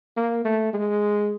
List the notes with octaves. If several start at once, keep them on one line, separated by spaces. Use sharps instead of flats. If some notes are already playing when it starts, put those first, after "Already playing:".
A#3
A3
G#3